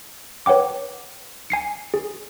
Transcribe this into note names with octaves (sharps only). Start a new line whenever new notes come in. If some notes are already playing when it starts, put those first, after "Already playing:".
B4 C#5 F#5 G5 D6
G#5 C7 C#7
G#4